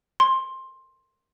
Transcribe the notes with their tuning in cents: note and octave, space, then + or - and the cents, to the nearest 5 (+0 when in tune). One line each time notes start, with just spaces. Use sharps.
C6 +15